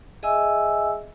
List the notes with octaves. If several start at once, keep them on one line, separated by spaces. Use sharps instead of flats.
G#4 D#5 E5 G#5 E6